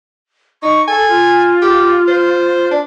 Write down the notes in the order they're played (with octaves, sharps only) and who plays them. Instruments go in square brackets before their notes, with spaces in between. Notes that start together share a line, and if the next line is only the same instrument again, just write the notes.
[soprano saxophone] D#4 [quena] C#6
[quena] A4 [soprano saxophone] G#5
[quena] F4
[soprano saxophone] G4
C5
D4